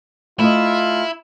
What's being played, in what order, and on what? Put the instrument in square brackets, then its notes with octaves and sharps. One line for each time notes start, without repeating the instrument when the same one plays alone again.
[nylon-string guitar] A3 D#5 [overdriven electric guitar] E4 [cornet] F4